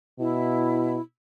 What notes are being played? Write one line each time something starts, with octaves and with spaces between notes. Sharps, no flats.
B2 E4